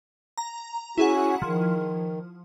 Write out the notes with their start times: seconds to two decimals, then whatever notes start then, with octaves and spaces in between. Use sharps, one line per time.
0.38 A#5
0.98 C#4 E4 F#4 G#4 F#5
1.42 D#3 F3